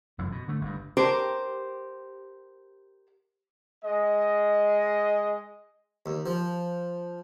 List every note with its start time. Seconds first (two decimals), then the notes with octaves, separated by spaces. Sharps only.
0.18 F1 F#2 E3
0.32 B2
0.48 D3 A3
0.61 G1 G2
0.97 G4 A#4 C5
3.85 G#3 D#5
6.06 D#2
6.26 F3